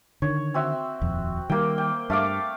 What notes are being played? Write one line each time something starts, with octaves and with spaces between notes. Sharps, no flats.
D3 D#3 C#5
C4 F#4 E5
D#1 F2
D#3 G3 A#3 G5
G5
G2 A3 F5 D6